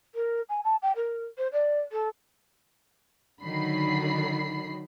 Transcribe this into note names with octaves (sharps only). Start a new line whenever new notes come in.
A#4
G#5
A5
G5
A#4
C5
D5
A4
D3 D#3 F#3 B5 C7